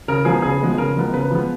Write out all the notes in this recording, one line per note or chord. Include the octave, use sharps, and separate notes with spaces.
C#3 A#4
F3 G#3 B3 G#4
C#3 G#4
F3 G#3 B3
C#3 A#4
F3 G#3 B3
C#3 B4
F3 G#3 B3